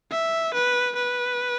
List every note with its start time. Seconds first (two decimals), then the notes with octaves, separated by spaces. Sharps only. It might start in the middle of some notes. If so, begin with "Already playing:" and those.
0.12 E5
0.54 B4
0.96 B4